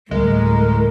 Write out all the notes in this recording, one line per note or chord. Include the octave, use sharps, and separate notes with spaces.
D2 A2 G3 G#3 A#4